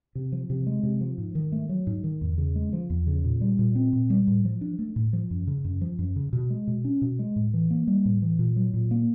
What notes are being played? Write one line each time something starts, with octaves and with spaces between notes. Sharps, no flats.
C3
F3
C3
G#3
C3
F3
G#2
D#3
A3
F#3
G#2
D#3
E2
C#3
G#3
F3
E2
C#3
A#2
G3
A#2
C4
A#2
G3
A2
F3
D4
A3
A2
F3
F#2
C#3
F#2
F3
F#2
C#3
B2
G#3
B2
C#4
B2
G#3
A2
E3
A#3
G3
A2
E3
A#2
F#3
A#2
A#3